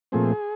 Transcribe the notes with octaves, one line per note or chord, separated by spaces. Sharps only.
A#2 F3 A3 C4 G#4